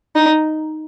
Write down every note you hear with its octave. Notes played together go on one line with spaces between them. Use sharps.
D#4